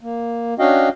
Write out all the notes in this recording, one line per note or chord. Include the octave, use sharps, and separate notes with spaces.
A#3
C#4 D4 F#4 D#5 F5 G5